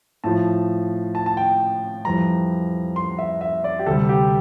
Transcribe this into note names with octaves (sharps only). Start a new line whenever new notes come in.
A2 F3 A5
A5
A5
G5
F2 E3 G3 A#5
C6
E5
E5
D5
G4
D2 C3 G3 A4
G4